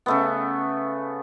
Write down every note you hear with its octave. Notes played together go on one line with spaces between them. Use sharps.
C#3 A3 B3